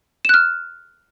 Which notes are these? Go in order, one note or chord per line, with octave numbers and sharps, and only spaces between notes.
F6 F#6 E7